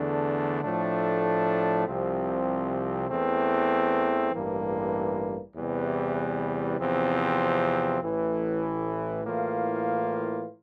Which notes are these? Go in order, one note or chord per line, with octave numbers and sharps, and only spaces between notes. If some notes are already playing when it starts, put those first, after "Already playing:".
Already playing: E2 D3 A3 D4
A2 F3 A3 D4
C2 C3 F3 C4
E2 E3 A3 C4
A1 G2 E3 A#3
E2 C3 E3 G3
E2 C3 F3 C4
A1 A2 E3
A2 E3 A#3 F4